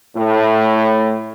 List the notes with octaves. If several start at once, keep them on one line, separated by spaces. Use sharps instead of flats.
A2